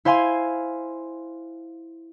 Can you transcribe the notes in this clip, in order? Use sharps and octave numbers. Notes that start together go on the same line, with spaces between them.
E4 C5 F5 G#5 C6